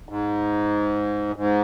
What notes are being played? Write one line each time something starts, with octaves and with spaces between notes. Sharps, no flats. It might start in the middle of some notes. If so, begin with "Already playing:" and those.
G#2
G#2